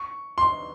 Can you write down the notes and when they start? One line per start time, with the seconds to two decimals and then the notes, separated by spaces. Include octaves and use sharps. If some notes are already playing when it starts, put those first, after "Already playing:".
Already playing: C#6
0.38 C6